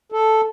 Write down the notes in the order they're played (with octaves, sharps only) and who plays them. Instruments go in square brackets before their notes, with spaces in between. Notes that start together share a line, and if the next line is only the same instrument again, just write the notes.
[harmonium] A4